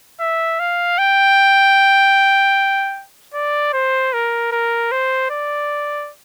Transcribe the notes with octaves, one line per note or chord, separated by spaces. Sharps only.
E5
F5
G5
D5
C5
A#4
A#4
C5
D5